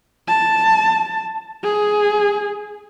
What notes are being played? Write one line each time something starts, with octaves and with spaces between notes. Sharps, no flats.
A5
G#4